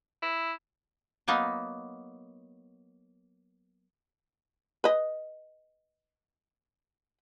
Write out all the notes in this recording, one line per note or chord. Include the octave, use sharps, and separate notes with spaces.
E4
F#3 A#3 B3 D#4
B4 D#5